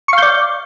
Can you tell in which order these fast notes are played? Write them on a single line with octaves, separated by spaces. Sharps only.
C#6 F5 G6 D5